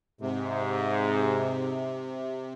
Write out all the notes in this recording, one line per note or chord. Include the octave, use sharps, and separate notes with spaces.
G#2 C3